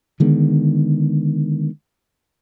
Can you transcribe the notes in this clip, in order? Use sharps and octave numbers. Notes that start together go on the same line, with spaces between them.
D3 D#3 G#3 B3